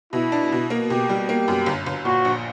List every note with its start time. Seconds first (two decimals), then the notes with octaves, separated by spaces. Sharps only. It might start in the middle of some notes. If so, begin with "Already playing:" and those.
0.13 B2 E4
0.32 D4
0.52 B2
0.70 A#3
0.90 B2 G4
1.09 G3
1.29 A#3
1.48 F#2
1.66 G1
1.86 G1
2.05 A#2 F#4
2.25 A#1